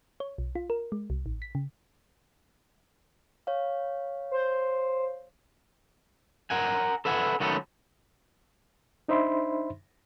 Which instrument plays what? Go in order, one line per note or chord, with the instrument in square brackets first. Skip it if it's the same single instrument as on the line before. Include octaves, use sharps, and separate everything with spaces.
[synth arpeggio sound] C#5
B1
F4
A#4
G#3
C2
A1
B6
C#3
[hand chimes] C#5 F5
[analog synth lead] C5
[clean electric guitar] A#4 F#5 G#5
A4 B4 E5 F#5 G#5
D#3 F#3 A3 B3 C#4 A4
[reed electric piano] D4 D#4 C5 E5 B5 C6